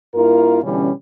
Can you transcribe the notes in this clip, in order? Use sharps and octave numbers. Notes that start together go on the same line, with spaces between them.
G2 A#3 E4 F4 A#4
B2 D3 E3 G3 C#4